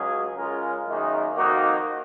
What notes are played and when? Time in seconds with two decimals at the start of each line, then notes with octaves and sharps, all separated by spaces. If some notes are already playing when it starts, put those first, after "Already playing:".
Already playing: C#2 C#3 F#3 C#4 G#4
0.37 C#3 G#3 C#4 F4 A#4
0.87 F#2 D#3 A#3 D#4 G#4
1.36 F2 D#3 A#3 D#4 F#4